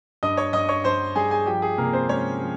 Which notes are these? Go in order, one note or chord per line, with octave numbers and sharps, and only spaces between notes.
G2 D#5 D#6
C#5 C#6
G2 D#5 D#6
C#5 C#6
G2 C5 C6
G3 G#4 G#5
G#4 G#5
F3 G4 G5
G#4
C3 A#3 A#4
C4 C5
G#3 C#4 C#5
F3